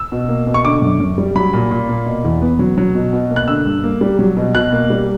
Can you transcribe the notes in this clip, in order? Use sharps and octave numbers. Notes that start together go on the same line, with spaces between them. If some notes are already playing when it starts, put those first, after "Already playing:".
Already playing: E6
B2
A#3
B2
C#6
D3 D6
F#2
F#2
G3
F#3 B5
A#2
A#2
A#3
B2
E2
B3
F#3
F#3
B2
B2
A#3
F#6
D3 E6
G2
A#3
G3
F#3
B2
B2 F#6
A#3
G3